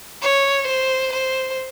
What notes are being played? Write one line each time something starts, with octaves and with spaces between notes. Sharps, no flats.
C#5
C5
C5